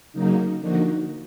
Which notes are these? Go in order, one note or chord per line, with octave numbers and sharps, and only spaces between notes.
C#3 F#3 A#3 D#4
D3 F3 A#3 D#4 F#4